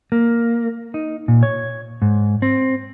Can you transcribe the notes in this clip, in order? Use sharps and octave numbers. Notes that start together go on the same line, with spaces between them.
A#3
D#4
A#2
C#5
G#2
C4